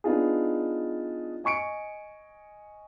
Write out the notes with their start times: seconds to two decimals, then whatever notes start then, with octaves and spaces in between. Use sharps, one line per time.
0.04 B3 D4 D#4 F4 G#4
1.44 D#5 G#5 C#6 C#7 D7